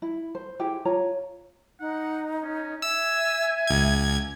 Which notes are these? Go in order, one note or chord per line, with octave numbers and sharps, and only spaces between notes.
E4
C5
E4 G4 G#4
F4 C#5 A#5
D#4 F#5
C#4
E5 G#5 E6
C#2 G#6